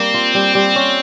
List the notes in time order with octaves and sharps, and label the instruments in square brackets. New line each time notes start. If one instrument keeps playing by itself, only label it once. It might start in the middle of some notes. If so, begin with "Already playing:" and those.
Already playing: [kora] G3 A#3 [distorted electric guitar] C4
[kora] F4
G3
G3
C#4